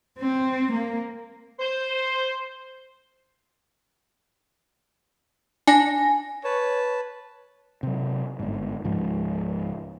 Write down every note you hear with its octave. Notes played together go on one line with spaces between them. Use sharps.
C4
A#3
C5
D4 G#5 A#6
B4 C#5 A5
C3 F#3
G1 G#2
C#2 G#2 F3 G#3